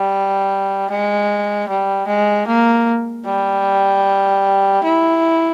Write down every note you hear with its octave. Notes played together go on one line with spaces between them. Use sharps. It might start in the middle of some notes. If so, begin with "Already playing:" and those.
Already playing: G3
G#3
G3
G#3
A#3
G3
E4